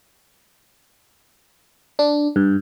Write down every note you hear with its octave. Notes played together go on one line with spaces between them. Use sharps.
D4
G2